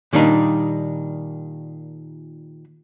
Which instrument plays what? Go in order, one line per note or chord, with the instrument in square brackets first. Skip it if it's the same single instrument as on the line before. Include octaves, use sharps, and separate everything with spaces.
[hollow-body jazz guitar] A#2 D#3 G3 D4 D#4